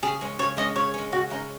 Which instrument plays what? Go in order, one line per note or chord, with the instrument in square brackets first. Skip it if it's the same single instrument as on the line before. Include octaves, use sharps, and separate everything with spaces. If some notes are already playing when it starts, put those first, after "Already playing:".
[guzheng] C#3 [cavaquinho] G#4
[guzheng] G#3 C#4
[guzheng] C#3 [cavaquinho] C#5
[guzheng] G#3 C#4 [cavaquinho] D#5
[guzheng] C#3 [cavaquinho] C#5
[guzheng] G#3 C#4
[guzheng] C#3 [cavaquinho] F#4
[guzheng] G#3 C#4 [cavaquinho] D#4